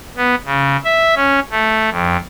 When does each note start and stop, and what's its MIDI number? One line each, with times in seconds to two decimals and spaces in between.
0.17 0.35 59
0.45 0.76 49
0.84 1.14 76
1.16 1.40 61
1.51 1.90 57
1.90 2.17 41